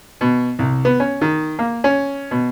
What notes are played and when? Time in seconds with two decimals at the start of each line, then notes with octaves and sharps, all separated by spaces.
0.21 B2
0.59 C2
0.85 B3
1.00 C#4
1.21 D#3
1.59 A#3
1.84 C#4
2.31 B2